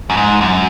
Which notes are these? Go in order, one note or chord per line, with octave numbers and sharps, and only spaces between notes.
F#2
G#2
F#2